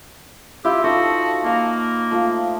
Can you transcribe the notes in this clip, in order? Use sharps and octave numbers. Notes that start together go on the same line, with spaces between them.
E4 F4 G4 E5
F3 D#4 F#4 A4
A#3 F5 A#5
F3 A3